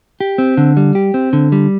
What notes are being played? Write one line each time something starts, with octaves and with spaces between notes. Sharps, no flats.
G4
C4
D3
G3
G4
C4
D3
G3